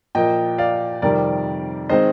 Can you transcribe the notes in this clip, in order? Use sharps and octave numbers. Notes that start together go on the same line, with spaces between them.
A#2 F3 A#3 D#5 G5
D5 F5
F2 C3 D#3 G3 A#4 D5
D#3 G#3 C4 C5 D#5